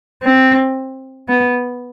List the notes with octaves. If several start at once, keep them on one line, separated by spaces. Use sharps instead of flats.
C4
B3